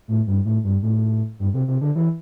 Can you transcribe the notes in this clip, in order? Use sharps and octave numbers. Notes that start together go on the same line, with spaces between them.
A2
G2
A2
G2
A2
G2
C3
C3
D3
E3